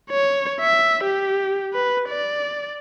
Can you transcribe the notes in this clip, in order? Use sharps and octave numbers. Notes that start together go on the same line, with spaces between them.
C#5
E5
G4
B4
D5